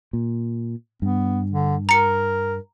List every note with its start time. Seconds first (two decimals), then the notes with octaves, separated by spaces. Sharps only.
0.13 A#2
1.02 G2 B3
1.51 D3
1.89 A#4 A#5 C#7